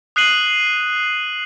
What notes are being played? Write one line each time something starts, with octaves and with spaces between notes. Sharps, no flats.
D#6 F#6 C7 D#7 F#7